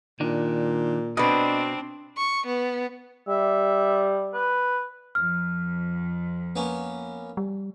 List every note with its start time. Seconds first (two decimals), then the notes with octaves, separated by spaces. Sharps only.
0.20 A#2 D#3 D4
1.17 B2 C4 D4 B4 D5 D#5
2.17 C#6
2.46 B3
3.29 G3 E5
4.34 B4
5.15 F2 F6
6.56 A#3 B3 C#4
7.37 G3